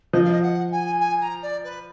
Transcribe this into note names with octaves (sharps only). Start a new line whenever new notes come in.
F3 D#5
F5
D#5
F#5
G#5
G#5
A#5
D5
B4